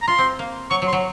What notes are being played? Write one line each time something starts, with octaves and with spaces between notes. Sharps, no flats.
A#5
F4 C6
C4
A#3
F#3 C#6
F#3
C6
F#3